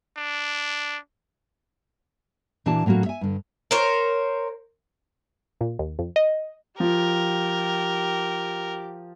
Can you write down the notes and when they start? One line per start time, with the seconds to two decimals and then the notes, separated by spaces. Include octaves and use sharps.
0.17 D4
2.66 A#2 E3 D4 F#4 A5
2.86 A2 F#3 A#3 C#4 F#4
3.06 E5 G#5
3.21 G2 D3
3.71 A#4 C5 C#5
5.61 A#2
5.79 D#2
5.99 F2
6.16 D#5
6.80 F3 G4 A#4